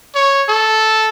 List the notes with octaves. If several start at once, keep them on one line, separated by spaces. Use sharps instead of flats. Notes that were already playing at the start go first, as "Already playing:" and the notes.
C#5
A4